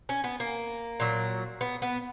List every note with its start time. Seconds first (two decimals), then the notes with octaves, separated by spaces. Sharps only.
0.09 C#4
0.24 B3
0.40 A#3
1.00 A#2 F#3
1.61 B3
1.82 B3